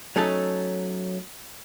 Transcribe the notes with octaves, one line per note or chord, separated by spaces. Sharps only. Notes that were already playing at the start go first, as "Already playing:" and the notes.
F#3 A3 C#4 D#4 A4